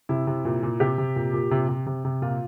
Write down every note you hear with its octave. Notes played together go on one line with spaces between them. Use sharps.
C3 E4
C3
A#2
A#2
C3 G4
C3
A#2
A#2
C3
C3
C3
C3
A#2 F4